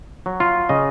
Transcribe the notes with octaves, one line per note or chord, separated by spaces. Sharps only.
F#3
F4
C#3 D#5